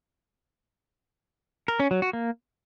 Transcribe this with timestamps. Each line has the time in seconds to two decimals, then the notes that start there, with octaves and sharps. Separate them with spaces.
1.68 A#4
1.80 C#4
1.91 F#3
2.02 F#4
2.13 A#3